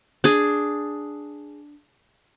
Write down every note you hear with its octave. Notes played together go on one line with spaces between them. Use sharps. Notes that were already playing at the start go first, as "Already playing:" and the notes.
D4 G#4